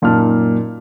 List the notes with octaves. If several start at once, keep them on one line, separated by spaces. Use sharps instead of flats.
F#2 A#2 D#4 A5 F6